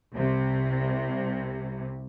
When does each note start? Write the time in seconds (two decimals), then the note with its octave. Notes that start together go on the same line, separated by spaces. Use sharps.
0.15 C2 C3